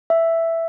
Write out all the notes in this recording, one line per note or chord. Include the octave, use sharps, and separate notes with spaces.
E5